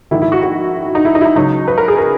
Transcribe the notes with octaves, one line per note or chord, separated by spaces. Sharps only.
A#1 G#2 D#3 E4
E4
F#4
F#4
D#4
E4
D#4
E4
D#4
C#2 C#3 F#3 D#4
B4
A#4
G#4
A#4